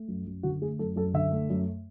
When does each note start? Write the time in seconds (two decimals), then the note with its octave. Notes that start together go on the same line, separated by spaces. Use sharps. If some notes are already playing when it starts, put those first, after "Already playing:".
Already playing: A3
0.08 F#2
0.26 F#2
0.43 D3 F#4
0.61 A3 G#4
0.79 F#2 A4
0.96 F#2 A4
1.14 D3 E5
1.32 A3
1.50 F#2